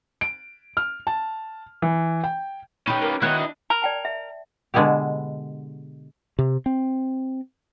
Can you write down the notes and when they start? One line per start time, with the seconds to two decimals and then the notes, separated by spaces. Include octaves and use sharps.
0.21 D7
0.77 F6
1.07 A5
1.82 E3
2.24 G5
2.87 C#4 D#4 G4 B4
3.02 A#3 D6
3.22 D#3 B3 E4 F#4 C#5 D#5 F#5 F#6
3.38 D4
3.70 A#4
3.82 D5 G5 A5
4.05 E5
4.74 B2 D3 G#3 B3 E4 G4
6.39 C3
6.66 C4